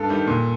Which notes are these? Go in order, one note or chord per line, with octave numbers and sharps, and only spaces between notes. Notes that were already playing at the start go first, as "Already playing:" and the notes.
Already playing: G2 A4
D#3 G3
A#2